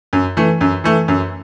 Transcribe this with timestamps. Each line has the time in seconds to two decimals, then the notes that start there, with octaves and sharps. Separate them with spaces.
0.13 F#2
0.37 E3 A3
0.61 F#2
0.84 E3 A3
1.08 F#2